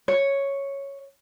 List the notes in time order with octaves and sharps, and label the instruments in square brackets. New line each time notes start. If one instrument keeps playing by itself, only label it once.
[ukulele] C#5